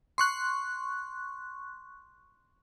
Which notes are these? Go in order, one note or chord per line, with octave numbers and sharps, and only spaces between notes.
C6 C#6 F#6